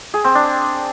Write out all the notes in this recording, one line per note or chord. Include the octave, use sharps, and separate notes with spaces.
G#4
C4
D4